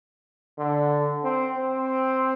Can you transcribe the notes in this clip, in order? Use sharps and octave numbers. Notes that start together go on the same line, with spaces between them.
D3
C4
C4